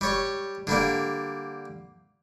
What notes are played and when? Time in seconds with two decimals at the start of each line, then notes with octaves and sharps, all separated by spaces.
0.01 G3 C#5 C#6
0.67 D3 G3 A#3